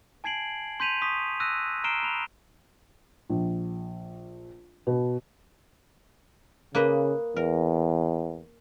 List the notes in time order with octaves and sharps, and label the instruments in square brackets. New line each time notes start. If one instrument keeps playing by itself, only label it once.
[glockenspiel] G#5 A5 G#6 C7 D7 F#7
C6 G6 B6 D#7 F7
C6 C#6 D#6 G6 B6
E6 F#6 A#6 D#7
A#5 F6 C7 D7 E7 G7
B5 F7
[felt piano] A#1
B2
[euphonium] C#3 [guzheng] A#3 B4 D#5
[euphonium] E2 [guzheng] A#4